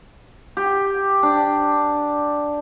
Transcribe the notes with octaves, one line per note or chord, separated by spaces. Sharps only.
G4
D4